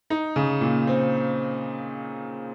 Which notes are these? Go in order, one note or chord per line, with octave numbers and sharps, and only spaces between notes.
D#4
C#3
A#2
C4